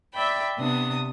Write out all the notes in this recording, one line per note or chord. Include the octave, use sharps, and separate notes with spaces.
D5 E5 G5 B5
C3 B3 D4 D#6